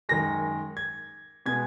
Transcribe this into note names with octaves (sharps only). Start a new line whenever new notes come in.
F#2 D#3 G#3 A#6
G#6
B2 G#3 B3 G#6